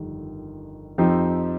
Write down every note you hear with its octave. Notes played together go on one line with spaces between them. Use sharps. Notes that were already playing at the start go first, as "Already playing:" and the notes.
Already playing: G1 F2 D#3 G3
F2 F3 C4 D#4 G4